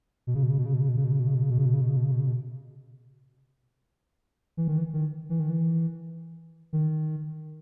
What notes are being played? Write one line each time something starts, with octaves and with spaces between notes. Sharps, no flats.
B2
C#3
B2
C#3
B2
C#3
B2
C#3
B2
C#3
B2
C#3
B2
C#3
B2
C#3
B2
C#3
B2
C#3
B2
C#3
B2
C#3
B2
C#3
B2
E3
D#3
E3
D#3
E3
D#3
E3
D#3